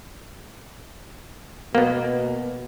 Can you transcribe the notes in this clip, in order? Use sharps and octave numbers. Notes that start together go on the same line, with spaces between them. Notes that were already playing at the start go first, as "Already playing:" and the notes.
B2 A#3 B3